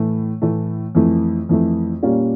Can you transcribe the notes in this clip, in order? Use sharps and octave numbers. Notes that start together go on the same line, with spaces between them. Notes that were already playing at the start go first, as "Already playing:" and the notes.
Already playing: A2 E3 A3
A2 E3 A3
F2 E3 A3
F2 E3 A3
A#2 G3 A#3 C#4 F4